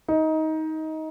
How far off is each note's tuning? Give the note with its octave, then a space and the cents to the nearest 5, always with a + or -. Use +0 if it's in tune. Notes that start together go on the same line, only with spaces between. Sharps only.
D#4 +20